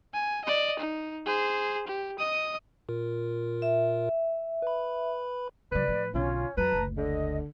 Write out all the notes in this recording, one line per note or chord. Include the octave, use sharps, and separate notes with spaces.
G#5
D5 D#5
D#4
G#4 C5
G4
D#5 D#6
A#2 F4 A#4
E5
B4 B5
C#3 F#3 B4 D5
A2 F3
B1 D3 C#4 F4
F2 F#3 B4 A5 A#5
F#1 D2
D3 D#5